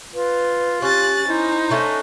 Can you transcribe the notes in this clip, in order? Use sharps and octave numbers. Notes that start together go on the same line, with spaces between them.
F4 B4
C#4 G4 F#6 A6
D#4 E4 C5
A3 C#4 D4